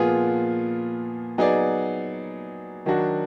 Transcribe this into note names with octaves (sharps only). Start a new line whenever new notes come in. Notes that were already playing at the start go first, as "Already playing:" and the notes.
Already playing: A#2 F3 B3 F4 G#4
F#3 B3 D#4 G#4 D5
D#3 F#3 D4 F#4